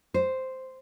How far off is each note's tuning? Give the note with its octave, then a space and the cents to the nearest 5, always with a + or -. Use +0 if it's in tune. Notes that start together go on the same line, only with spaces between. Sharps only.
C5 -5